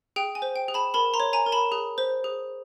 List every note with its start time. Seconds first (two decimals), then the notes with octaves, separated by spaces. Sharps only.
0.16 G#4 G5
0.35 G#5
0.42 C5
0.56 G5
0.68 G#4
0.74 A5 B5
0.94 A#4 A5 B5
1.14 A#5 C6
1.20 C#5
1.33 G#5 A#5
1.46 A#4
1.52 A5 B5
1.72 G#4
1.98 C5
2.24 G#4